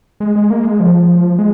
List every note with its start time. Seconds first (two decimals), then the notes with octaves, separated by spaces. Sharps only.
0.20 G#3
0.36 G#3
0.50 A#3
0.65 G#3
0.80 F3
1.39 G#3